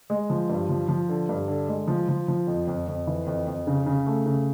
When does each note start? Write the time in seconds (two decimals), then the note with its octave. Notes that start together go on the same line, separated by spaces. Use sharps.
0.10 G#3
0.30 F3
0.50 G2
0.69 F3
0.89 F3
1.09 D3
1.29 G2
1.48 D3
1.68 G#3
1.88 F3
2.09 F3
2.28 F3
2.47 F2
2.67 F2
2.88 F2
3.07 E3
3.27 F2
3.47 F2
3.67 C#3
3.86 C#3
4.07 A3
4.26 C#3